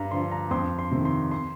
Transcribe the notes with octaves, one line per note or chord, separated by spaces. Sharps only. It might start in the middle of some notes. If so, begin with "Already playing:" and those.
Already playing: G2 A#5
D3 F3 C6
A#5
F2 C6
C6
C3 D#3
C6
C6